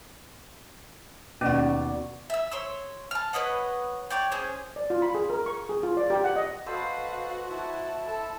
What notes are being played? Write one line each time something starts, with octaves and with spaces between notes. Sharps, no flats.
D#2 B2 C#4 F#4 D5
E5 E6
C#5 C6 E6
A5 F6
B4 C#5 D#5 F#5
C#5 D5 G5
C#4 G#4 C5
D5
F4
B5
G#4
A#4
C#6
G#4
F4
D5
G4
F#5
D#5
F#4 A4 B4 C5 D#5 F5
E4 A5
A4